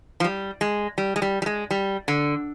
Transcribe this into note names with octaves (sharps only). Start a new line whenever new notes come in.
F3
G3
G#3
G3
G#3
G3
G3
G#3
G3
D3